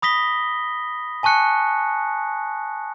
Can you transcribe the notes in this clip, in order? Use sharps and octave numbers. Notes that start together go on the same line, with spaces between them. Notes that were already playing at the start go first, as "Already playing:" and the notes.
B5 D#6 A#6 B6 G7
G#5 A5 C#6 F#6 C#7